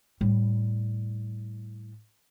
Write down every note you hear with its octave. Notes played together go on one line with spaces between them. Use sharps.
A2 G3